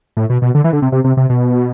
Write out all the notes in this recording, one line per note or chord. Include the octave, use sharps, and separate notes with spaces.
A2
B2
B2
D3
E3
D3
C3
C3
C3
C3
B2